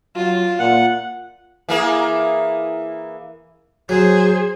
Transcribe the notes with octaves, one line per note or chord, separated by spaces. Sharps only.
F#3 F4
A#2 F#5
E3 A#3 G#4
F#3 G#4 C5